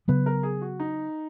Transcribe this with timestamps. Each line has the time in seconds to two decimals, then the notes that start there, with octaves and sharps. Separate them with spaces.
0.08 C#3 F#3 B3 B4
0.26 A#4
0.43 G#4
0.62 F#4
0.80 D#4